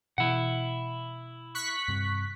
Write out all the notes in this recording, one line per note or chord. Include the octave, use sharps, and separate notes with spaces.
B2 E3 E4 F#5
C#6 F#6 B6
G2 C3